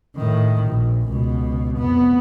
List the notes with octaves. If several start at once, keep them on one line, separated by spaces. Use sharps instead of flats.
A2 D#3
A#1
C#2 B2
F1 B3